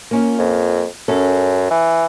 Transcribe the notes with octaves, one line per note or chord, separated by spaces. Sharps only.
A#3 C#4 F4
F2
F#2 C#4 A4
E3